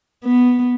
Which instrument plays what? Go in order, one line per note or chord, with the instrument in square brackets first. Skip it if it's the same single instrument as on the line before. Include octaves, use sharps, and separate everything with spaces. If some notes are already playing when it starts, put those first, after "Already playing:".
[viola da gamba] B3